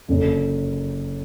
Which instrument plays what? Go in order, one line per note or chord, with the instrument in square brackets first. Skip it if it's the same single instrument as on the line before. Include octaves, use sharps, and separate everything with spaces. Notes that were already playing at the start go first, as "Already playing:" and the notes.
[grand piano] F#1 F#2 D3